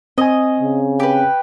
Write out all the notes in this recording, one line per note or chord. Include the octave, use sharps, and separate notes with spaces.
C4 D#5 G#5
C#3
G4 B4